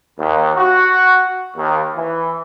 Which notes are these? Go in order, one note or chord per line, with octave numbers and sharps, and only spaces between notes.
D#2
F#4
D#2
E3